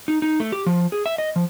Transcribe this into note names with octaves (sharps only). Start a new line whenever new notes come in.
D#4
D#4
A3
G4
F3
G#4
E5
D#5
F3